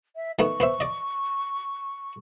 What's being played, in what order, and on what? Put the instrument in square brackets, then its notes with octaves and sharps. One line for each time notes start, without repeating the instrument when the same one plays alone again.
[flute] E5
[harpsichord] D#3 A3 B3 [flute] C#6
[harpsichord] B3 C5 E5
D5 D#5